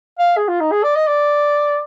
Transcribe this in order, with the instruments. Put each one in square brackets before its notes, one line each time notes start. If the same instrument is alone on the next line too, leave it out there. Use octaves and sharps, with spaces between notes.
[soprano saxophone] F5
G#4
F4
D#4
G#4
D5
D#5
D5